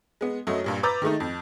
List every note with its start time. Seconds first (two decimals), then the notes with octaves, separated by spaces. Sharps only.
0.21 G#3 B3
0.47 F#2 F#3 A3 D#5
0.64 G2 A#2 G3
0.83 B4 A#5 D6 E6 G6 A6
1.02 D#3 G#3 A3 D#4
1.20 F2